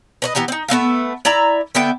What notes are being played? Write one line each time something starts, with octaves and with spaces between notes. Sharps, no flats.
B4 C#5 D#5
E3 B3 G4 A#5
C4 D#4
A3 B3 E5 F5
E4 D5 E5 A#5
D3 B3 E5 G5